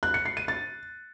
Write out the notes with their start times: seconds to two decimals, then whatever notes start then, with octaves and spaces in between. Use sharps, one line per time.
0.03 F#6
0.14 C#7
0.25 C7
0.37 D#7
0.48 A6